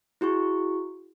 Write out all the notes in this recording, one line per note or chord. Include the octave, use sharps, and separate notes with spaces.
E4 F#4 G#4 C#6